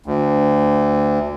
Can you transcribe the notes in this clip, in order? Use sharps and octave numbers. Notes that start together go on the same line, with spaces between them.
D2